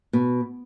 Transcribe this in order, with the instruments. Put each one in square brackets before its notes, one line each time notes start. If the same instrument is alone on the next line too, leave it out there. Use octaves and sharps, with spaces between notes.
[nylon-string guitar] B2